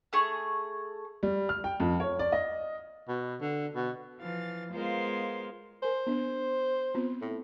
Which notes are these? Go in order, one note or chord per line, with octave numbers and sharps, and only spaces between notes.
A3 G#4 C#6
G3
F6
G5
F2
C#5
D5
D#5
B2
D3
B2
E3 F3 F5 A6
G#3 B3 F4 A#4 C5 F5
A#4 C5 G#5
B3 D4
B3 C4 F4
A2